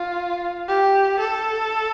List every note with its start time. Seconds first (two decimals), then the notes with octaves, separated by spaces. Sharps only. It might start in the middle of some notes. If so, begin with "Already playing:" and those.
Already playing: F4
0.68 G4
1.19 A4